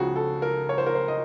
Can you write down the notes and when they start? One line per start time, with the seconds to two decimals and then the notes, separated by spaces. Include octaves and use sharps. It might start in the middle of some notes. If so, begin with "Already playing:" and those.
Already playing: C#2 C#3 F3 F#4
0.16 A4
0.42 A#4
0.69 C#5
0.78 C5
0.86 A#4
0.95 C5
1.08 D#5